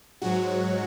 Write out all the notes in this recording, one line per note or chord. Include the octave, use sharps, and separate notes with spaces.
G#2 F#3 F#4